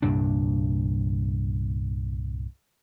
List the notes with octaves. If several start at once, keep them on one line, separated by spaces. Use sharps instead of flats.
C2 G2 A#2 D4